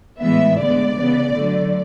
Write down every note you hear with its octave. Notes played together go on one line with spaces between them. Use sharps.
A2 E3 G#3 B3 E5
D3 G#3 B3 D5
C#3 E3 B3
D3 F#3 A3